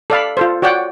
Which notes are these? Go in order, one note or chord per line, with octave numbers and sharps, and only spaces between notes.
A4 D5 F5 B5
F4 A4 C5
F#4 C#5 D5 F#5 G5